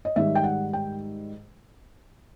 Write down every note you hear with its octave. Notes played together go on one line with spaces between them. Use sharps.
D#5
G#2 D#3 G3 E5
G5
F#5
G5